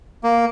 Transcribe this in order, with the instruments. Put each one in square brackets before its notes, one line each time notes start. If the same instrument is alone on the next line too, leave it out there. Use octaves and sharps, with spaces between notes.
[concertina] A#3